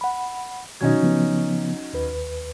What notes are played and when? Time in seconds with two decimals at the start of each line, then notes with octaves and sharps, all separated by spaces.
0.01 F#5 B5
0.81 B2 D#3 F#3 C#4 D#4 G#6
1.02 C#3 F3 B3
1.93 D#2 B4